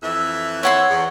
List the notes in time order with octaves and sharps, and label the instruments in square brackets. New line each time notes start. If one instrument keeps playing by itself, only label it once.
[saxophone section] F2 E3 E5
[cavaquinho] B4 F#5 C6 [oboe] C#5
[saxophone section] E2